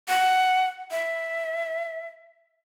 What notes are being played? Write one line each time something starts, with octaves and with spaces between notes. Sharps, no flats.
F#5
E5